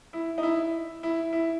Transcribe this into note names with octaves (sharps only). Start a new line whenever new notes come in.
E4
D#4
E4
E4
E4